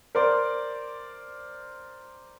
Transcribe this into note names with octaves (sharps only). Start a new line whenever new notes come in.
A#4 C5 D5 C6